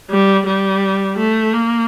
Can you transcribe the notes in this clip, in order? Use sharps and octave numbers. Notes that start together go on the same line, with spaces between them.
G3
G3
A3
A#3